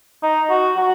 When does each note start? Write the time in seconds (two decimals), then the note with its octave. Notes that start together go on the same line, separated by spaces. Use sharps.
0.23 D#4
0.50 F#4
0.77 F#4